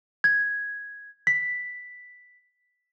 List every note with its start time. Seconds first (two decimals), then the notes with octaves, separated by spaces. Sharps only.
0.24 G#6
1.27 B6